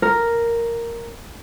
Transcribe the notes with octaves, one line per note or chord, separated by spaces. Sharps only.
A#4